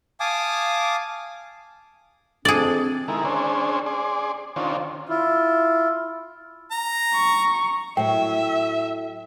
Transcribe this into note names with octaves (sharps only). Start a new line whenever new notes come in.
F5 G#5 A5 D6 D#6
F2 C4 D4 G#4 D5
D#3 G#3 E4 A#4
C#4 D4 G#4 C5
G#4 D5 C6
D#3 C#4 D4 F4 C5
E4 F4
A#5
C#6
A2 F#3 E5 G5